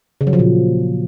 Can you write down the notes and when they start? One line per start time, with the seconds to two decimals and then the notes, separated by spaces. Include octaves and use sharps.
0.21 C#3
0.27 F#3
0.33 F3
0.39 A#2